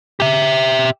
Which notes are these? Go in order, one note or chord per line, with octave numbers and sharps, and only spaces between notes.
G4 E5